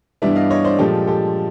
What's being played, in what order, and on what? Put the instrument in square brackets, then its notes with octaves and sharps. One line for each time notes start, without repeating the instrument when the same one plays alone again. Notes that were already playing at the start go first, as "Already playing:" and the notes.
[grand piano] G2 E3 G3 B3 D4 D5 E5
D#5 F5
C#5 D#5
C5 D5
A#2 F3 G#3 G4 A4
G4 A4